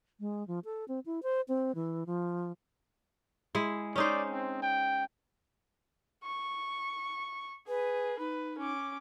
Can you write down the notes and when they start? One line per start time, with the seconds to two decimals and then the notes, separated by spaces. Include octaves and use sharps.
0.20 G#3
0.48 F3
0.65 A4
0.88 C4
1.06 E4
1.23 C5
1.48 C4
1.75 E3
2.06 F3
3.55 G#3 E4
3.96 C#4 D#4 C5 D5
4.30 C4
4.62 G5
6.24 C#6
7.68 G#4 B4
8.19 D#4 B4
8.58 C#4 D6